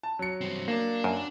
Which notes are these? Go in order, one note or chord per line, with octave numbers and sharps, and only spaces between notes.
A5
F#3 C#7
G2 C4
A#3 D4 D5
F#2